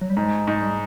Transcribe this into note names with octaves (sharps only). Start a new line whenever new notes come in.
F#3
G3
G#2 G#3
G#2
G3